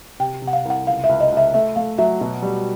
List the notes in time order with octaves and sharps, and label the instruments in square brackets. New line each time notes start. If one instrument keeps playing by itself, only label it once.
[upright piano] C3 [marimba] G5
[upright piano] C3
[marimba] F#5
F5
[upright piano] C2
[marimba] F#5
[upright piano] C#2 [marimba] F5
[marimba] E5
[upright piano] C#2
[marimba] D#5
[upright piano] C#2
[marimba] E5
[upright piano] A3 [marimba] E5
[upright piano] A3 [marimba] F5
[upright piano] F#3 [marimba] E5
[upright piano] B2
G3